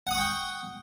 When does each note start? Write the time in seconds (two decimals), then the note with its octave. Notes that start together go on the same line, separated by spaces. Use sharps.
0.07 F#5
0.11 D#6
0.15 C#6
0.19 G5